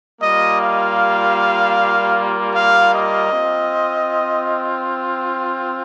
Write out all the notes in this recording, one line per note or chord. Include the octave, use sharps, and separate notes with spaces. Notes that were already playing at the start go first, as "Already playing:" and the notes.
G3 A#3 F4 D#5
F5
F5
D#5
C4 F4